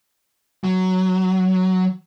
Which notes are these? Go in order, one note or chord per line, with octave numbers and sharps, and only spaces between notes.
F#3